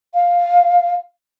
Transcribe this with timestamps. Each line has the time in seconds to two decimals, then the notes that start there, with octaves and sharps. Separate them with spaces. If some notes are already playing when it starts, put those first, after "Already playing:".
0.14 F5